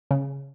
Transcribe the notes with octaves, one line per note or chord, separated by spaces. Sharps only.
C#3